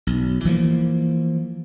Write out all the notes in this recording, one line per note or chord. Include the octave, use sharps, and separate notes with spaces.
B1
E3 F3 G#3 A#3